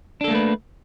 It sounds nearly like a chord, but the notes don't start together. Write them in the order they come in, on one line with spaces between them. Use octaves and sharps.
D4 A4 A#3 A3 B4